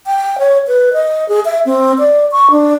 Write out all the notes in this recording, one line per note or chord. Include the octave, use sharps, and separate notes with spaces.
G5
C#5
B4
D#5
G#4
E5
C4
D5
C#6
D4